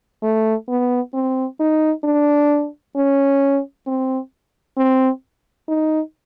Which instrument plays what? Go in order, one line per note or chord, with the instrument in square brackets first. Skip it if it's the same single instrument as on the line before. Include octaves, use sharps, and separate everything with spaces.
[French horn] A3
B3
C4
D#4
D4
C#4
C4
C4
D#4